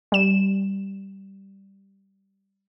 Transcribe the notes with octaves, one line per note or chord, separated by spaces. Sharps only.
G3 E7